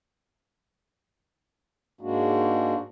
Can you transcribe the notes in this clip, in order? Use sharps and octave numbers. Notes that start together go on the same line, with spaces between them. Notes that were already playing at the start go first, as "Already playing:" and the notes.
G#2 G#3 A#3 D4 F#4